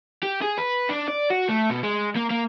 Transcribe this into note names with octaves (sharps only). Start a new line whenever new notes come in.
G4
G#4
B4
D4
D5
F#4
A3
B2
G#3
A#3
A#3